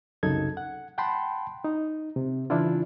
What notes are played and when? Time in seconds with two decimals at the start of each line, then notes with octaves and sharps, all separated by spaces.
0.23 C2 F#2 C#3 D#4 A4 G#6
0.57 F#5
0.98 F#5 G5 A5 B5 C6
1.64 D#4
2.16 C3
2.50 C#3 E3 D4 E4 F4